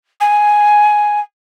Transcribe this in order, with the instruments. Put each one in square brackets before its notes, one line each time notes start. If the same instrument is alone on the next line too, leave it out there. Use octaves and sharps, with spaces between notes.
[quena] G#5